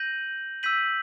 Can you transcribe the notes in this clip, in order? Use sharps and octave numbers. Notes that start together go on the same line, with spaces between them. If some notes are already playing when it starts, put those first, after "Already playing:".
Already playing: G6 A#6 D#7 F#7
E6 G6 B6 D#7 F#7